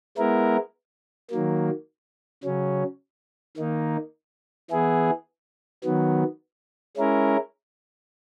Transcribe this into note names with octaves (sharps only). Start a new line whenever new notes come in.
G#3 B3 E4 A#4
D#3 F#3 A#3
C#3 F#3 C#4
D#3 A#3 D#4
E3 B3 E4 G#4
D#3 F#3 B3
G#3 C#4 E4 A#4